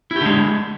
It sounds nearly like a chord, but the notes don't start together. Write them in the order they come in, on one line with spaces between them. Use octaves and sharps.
E4 G4 D3 G#3